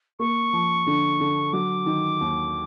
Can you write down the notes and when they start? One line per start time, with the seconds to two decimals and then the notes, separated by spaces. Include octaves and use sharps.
0.19 A#3 C#6
0.53 F3
0.87 D3
1.20 D3
1.53 F#3 D6
1.86 D#3
2.21 D#2